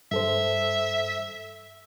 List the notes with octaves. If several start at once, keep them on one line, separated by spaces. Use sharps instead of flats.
G2 A4 C5 E5